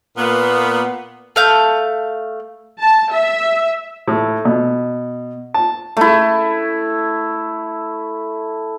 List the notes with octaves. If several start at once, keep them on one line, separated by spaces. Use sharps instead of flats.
A#2 A#3 B3
A3 F5 G6
A5
E5
A2
B2
A5
A3 E4